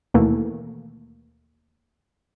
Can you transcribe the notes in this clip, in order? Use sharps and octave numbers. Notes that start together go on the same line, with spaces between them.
D#2 B2 E3 A3 A#3